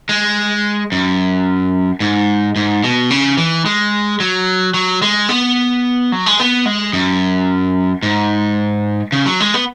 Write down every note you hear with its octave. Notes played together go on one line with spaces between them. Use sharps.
G#3
F#2
G#2
G#2
B2
C#3
E3
G#3
F#3
F#3
G#3
B3
F#3
G#3
B3
G#3
F#2
G#2
C#3
F#3
G#3
B3